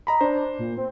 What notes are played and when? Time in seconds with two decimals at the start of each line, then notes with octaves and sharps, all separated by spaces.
0.07 D#5 A#5 B5
0.21 D4 C5
0.59 A#2
0.78 C4